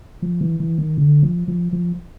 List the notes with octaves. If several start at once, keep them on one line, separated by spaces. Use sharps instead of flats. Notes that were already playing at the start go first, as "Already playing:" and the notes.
F3
E3
E3
D#3
D3
F3
F3
F3